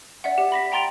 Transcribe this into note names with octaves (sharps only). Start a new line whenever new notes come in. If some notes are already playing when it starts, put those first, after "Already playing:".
D5 E5 F#5
G4
B5 A#6 B6
G5 A#5 C6 A6 D7 F7